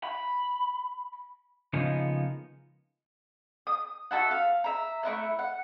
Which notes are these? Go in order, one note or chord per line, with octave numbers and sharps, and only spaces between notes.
B5
C#3 F3 G#3 A#3 B3 D#4
D#6
F#4 A4 E5 F#5
F5
E5 A#5
A3 C4 E4 F#6
F#5